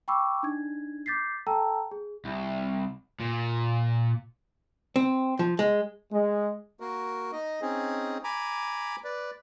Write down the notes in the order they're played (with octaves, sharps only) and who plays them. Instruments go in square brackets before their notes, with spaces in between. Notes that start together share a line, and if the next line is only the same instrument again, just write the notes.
[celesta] G5 B5 C#6 D6 E6
D4 D#4 G#6
D6 G6 A6 B6 C7
A4 G5 A5 A#5 E6
G#4
[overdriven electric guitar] C2
A#2
[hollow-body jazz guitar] C4
F3
G#3
[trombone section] G#3
[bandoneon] A#3 F#4 A#4
D#4 D#5
C4 C#4 D#4 G#4
G#5 A#5 B5 D6
B4 D5